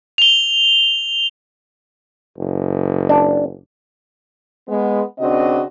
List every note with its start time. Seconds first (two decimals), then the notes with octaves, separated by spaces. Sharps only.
0.18 F7 G7
2.38 F#1
3.09 D4
4.68 G#3 B3
5.19 D#2 C#3 C4 D4 F#4 D#5